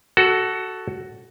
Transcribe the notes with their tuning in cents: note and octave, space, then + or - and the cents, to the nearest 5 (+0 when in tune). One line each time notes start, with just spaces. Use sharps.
F#4 +10 A4 +0